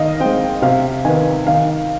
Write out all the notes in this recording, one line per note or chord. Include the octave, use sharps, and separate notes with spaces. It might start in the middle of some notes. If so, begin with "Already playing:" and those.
Already playing: D#3 D#5 F5
G#3 C4 G5
C3 F5
D#3 B3 G#5
D#3 F5